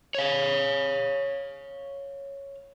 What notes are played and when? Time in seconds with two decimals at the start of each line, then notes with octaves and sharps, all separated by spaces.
0.15 C#5 F5